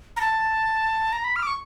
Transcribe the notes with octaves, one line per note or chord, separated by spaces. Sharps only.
A#5
A5
A#5
B5
F6
D6
C#6